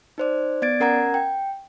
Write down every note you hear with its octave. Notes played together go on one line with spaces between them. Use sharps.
D#4 C5 D5
B3 D5 G#6 A6 D7
C#4 A#4 F#5 A#5 G#6
G5